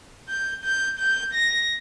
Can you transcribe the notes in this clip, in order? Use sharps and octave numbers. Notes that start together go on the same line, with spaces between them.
G6
G6
G6
A#6